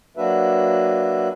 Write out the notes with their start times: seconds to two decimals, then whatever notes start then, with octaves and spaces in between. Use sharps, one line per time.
0.17 F#3 A#3 D4 F#4 B4 E5